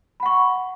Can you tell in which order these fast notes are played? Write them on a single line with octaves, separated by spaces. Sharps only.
B5 F#5 C#6